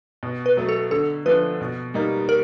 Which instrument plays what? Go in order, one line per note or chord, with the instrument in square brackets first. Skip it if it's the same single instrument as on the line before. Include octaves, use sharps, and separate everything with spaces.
[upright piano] B2
[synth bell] B4
[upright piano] F#3 A3
[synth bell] A4
[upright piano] D3 [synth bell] A4
[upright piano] F3 A3 D4 [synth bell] B4
[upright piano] B2
G3 A#3 D#4
[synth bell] A#4